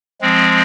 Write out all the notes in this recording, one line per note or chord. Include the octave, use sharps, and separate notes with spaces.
F3 G#3 C4